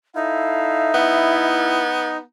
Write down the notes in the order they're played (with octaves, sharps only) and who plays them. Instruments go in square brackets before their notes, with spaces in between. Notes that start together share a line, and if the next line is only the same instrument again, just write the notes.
[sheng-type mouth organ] D#4 [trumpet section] E4 A4 F5 [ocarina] E5
[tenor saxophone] B3 [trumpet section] E4